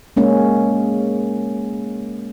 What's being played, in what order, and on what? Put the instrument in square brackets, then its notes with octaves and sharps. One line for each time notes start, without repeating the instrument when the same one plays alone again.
[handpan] G#3 A#3 C#4